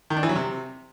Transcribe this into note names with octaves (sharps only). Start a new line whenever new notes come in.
D#3
D4
E3
F#3
C3